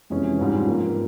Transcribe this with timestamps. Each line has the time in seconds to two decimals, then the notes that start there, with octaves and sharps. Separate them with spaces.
0.10 F2 C3 E3 G#3 C#4
0.39 G#2 G3 C#4 F4
0.66 G2 F3 A#3